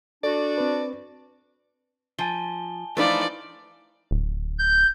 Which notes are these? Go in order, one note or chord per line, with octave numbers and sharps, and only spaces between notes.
D4 F#4 A4 D5
C4 B4
F3 G#5 A5 G7
E3 F3 A3 D4 D#4 F4 B4 D5
D1
G6